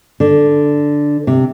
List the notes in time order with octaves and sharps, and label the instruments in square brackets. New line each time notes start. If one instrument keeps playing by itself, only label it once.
[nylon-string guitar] D3
C3